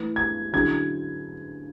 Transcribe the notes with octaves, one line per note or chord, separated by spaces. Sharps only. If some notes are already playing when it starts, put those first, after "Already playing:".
Already playing: E3 A3 E4 B4
G#6
D3 F#3 C#4 E4 G#4 G#6